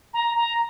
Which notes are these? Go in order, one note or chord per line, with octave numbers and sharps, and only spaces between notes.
A#5
A#5